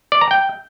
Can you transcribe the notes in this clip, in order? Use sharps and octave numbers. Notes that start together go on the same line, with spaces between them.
D5
A#5
G5